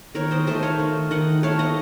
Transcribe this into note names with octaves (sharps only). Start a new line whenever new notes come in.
D#3 A#4 C#5
C5 D#5
A3 C5 D#5
C#5 F5
D#3
D#3 D#5 F#5
A3 C#5 F5
D#5 F#5